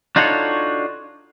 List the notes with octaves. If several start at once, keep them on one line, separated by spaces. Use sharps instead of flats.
D4 D#4 F4 F#4 A4 C#5